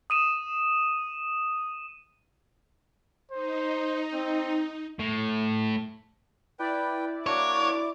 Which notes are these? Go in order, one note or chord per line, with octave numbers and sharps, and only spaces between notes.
D#6 D#7 E7
D#4 C5
C4
A2
E4 B4 D5 G5
A#3 D4 F#4 C#5 D6